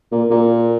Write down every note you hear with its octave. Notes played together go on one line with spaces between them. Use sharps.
A#2
A#2